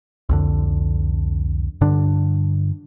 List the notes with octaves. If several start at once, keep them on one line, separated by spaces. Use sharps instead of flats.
C2 F2 D3
G2 D3 D4